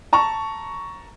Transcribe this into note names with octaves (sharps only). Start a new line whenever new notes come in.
A5 A#5 C#6